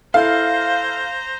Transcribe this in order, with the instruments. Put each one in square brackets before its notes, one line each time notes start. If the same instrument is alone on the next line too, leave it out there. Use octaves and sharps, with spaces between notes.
[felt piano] E4 A4 [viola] C5 A#5 [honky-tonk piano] F5